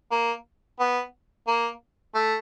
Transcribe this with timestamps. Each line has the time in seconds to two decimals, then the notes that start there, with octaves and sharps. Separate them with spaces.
0.11 A#3
0.80 B3
1.47 A#3
2.15 A3